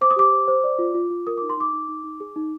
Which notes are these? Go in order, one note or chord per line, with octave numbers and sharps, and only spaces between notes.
C5 D6
D#6
G4 D6
C5
C5
D5
F4
F4
F4
A#4 D#6
D#4 D6
C6
D#4 D6
D#4
D#4
D#4
G#4
D#4